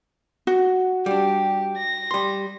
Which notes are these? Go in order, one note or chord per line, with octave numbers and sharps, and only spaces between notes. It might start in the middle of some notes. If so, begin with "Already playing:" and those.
F#4
G3 D4 G4
A#6
G3 C6